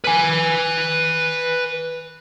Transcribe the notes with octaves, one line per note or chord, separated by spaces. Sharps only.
B4 G#5